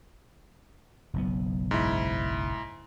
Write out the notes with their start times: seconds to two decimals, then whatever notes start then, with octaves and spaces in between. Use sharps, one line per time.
1.14 F#1 B1 B3
1.71 G#2 E4